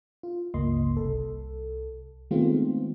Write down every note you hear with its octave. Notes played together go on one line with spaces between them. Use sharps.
F4
G1 C#2 A#3 D#5 C6
C2 A4
D#3 G#3 A3 B3 C4 F4